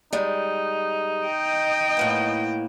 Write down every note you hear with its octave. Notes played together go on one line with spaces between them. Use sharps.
G3 G#3 D#4
D#5 G5
A2 A#3 B3